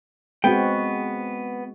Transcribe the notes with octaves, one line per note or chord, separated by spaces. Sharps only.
G#3 B3 C4 F#4 G5